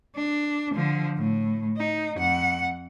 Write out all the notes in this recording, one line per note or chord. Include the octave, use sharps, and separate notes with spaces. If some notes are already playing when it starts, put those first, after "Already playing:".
D4
D3 F3
A2
D#4
F2 F#5